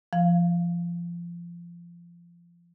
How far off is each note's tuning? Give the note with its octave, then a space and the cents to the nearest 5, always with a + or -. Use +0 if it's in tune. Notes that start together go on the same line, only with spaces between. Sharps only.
F3 -25 F5 +0